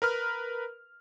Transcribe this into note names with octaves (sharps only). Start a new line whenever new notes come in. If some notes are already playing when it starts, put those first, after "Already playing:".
A#4 B4 F6